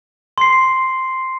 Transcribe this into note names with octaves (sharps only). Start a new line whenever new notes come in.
C6 C7